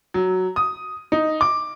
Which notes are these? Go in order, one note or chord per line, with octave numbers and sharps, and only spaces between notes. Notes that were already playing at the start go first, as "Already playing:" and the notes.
F#3
D#6
D#4
D6